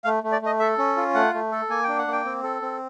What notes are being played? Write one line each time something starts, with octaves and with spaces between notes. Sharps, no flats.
A3 F5
A3
D5
A3 D#5
A4 E5
C#4
F4
A3 F#5
A3
A4
A#3 G#5
D4 G5
F#5
A#3
G5
C4
A4
C4